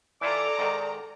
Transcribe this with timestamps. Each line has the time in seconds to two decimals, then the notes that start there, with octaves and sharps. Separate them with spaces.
0.21 E3 E4 F4 A4 D5 A#5 D6
0.59 G#2 D#3